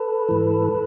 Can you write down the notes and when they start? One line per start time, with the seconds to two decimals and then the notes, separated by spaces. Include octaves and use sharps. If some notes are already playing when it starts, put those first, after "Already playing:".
Already playing: A4 B4
0.29 G#2 E3